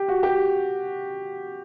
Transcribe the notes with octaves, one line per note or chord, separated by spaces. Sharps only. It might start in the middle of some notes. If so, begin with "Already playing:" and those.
Already playing: G4
F#4
G4